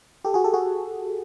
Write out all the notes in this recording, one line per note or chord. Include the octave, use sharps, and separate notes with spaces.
G4 A4
F#4 G#4
G4 A4
F#4 G#4